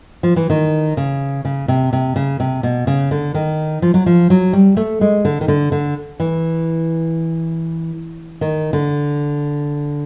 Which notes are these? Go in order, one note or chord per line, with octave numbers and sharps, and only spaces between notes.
F3
E3
D#3
C#3
C#3
C3
C3
C#3
C3
B2
C#3
D3
D#3
F3
F#3
F3
F#3
G3
A3
G#3
D3
D#3
D3
D3
E3
D#3
D3